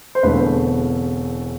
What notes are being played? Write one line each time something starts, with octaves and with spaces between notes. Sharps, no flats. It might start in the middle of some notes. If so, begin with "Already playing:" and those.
C5
E1 E2 D3 A3 C4 B4